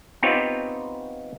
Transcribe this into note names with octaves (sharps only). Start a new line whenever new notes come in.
B3 C4 D#4 F4 G4 C#5